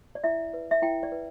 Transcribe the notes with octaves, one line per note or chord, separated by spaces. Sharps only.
D5
E4 E5
B4
E5
E4 G5
D5
B4